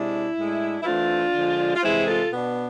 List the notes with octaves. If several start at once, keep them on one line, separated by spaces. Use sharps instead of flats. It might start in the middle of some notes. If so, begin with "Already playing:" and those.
Already playing: C3 G#3 D4 E4
A2 G#3 D4
E4
E3 A3 C4 D4 F4
D3 F3 G#3
F4
C3 E3 G#3 C4 E4 G#4
F4 A4
B2 B3 D4